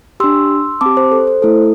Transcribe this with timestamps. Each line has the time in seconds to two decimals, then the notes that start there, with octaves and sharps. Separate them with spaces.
0.20 D4 G4 C6 E6
0.81 C4 G4 A5 D6
0.97 C5
1.12 A4
1.27 C5
1.42 A3 E4 A4